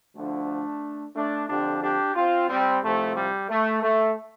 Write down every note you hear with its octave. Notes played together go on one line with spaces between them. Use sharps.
D2 D3 F3 A3 D4
A3 D4
F2 D3 F3 D4 G4
D4 G4
C4 F4
G3 C4
C2 C3 F3 A3
G3
A3
A3